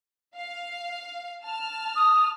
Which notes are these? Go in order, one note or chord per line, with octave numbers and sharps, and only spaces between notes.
F5
A5 F6
D#6